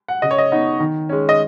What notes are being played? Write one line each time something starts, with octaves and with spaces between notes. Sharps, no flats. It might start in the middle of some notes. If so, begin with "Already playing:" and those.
F#5
C#3 D#5
C#5
D#5
B3 D#4
D#3
G#3 C#4
D#5